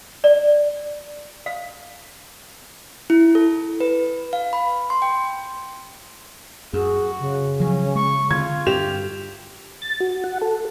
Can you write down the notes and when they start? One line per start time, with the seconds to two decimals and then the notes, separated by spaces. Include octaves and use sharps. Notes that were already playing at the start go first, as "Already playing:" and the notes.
0.24 D5
1.46 F5
3.10 E4
3.35 A4
3.80 B4
4.33 F5
4.53 B5
4.90 C6
5.02 G5
6.73 F#2 F#4 G#4
7.19 C#3
7.60 F3 F#3 C#4
7.95 G#3 C#6
8.31 D3 F4 G#6
8.67 G2 G4 E7 F7
9.82 A6
10.00 F#4
10.24 F#5
10.42 A4